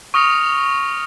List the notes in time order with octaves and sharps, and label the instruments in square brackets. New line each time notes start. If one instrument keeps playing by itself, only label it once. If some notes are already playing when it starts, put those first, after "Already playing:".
[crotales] C#6 D#6 F6 A#6 C#7 F7